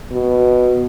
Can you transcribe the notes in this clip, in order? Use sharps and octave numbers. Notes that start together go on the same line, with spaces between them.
B2